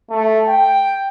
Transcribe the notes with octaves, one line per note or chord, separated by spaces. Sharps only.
A3
G5